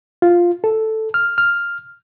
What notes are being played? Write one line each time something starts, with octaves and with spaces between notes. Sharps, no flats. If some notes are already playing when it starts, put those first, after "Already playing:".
F4
A4
F6
F6